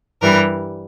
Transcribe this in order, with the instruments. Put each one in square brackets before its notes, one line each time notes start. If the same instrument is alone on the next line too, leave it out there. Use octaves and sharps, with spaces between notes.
[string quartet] G2 E3 G3 A#4